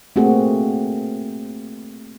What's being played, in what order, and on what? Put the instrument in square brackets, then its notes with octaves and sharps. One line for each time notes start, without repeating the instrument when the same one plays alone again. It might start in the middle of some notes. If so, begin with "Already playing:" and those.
[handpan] A3 A#3 C4 F#4 G#4